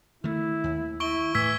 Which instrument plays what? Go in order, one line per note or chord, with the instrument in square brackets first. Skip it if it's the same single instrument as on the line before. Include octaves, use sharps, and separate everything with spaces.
[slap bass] D#3 A3 [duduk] E4
[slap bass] D#2
[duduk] E4 [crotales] C#6 D7 G7
[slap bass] A2 [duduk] E3 [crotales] E6 G#6 B6